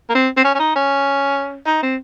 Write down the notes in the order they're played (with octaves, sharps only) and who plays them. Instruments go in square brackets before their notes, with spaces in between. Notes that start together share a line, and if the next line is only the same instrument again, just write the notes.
[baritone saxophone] A#3
C4
C4
C#4
C#4
D#4
C#4
D#4
C4